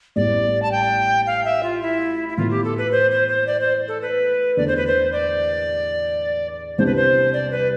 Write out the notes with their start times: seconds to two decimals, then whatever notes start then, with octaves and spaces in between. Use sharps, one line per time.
0.16 A1 A2 G3 B3 D5
0.62 A5
0.71 G5
1.26 F5
1.44 E5
1.63 F4
1.82 E4
2.29 E4
2.37 A2 E3 B3 F4
2.50 G4
2.64 A4
2.78 B4
2.92 C5
3.11 C5
3.28 C5
3.47 D5
3.61 C5
3.88 A4
4.02 B4
4.57 E2 D3 A3 D5
4.68 C5
4.76 B4
4.87 C5
5.12 D5
6.78 C2 C3 E3 G3 D4 C5
6.86 B4
6.96 C5
7.33 D5
7.51 B4